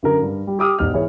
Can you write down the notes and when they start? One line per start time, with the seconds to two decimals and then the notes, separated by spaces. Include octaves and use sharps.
0.03 F#2 D3 A#4
0.22 G2
0.47 G3
0.59 G4 D6 D#6 F6
0.79 E1 G#2 G4 F6
0.94 E3 G#4 C#5